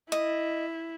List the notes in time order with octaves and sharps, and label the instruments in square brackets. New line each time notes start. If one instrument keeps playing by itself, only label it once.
[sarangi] E4 [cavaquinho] D#5